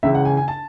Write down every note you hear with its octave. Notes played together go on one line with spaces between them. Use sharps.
C#2 C#3 E3 E5
F#5
G#5
G#5
A5